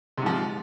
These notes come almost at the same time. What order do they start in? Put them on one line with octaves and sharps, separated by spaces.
C3 G#2 F3